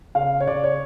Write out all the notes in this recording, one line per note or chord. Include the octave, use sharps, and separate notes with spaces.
C#3 F5
C#5
C#3 D5
C#5